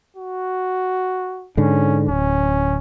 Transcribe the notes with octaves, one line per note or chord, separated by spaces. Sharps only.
F#4
G#2 D3 C#4
D1 C#4